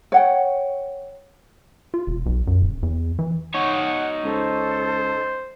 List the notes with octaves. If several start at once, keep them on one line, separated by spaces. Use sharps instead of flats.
C#5 F#5 G5
F4
E1
B1
F#2
D#1
E2
E3
D#4 C#5 F#5
C#2 A4 C5